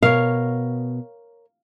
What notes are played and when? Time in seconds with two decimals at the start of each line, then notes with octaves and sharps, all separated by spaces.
0.03 B2 A#4 C#5 F5